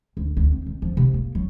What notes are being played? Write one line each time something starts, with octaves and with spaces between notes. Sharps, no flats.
D2
D2
C4
F2
F3
C3
A#3
F#3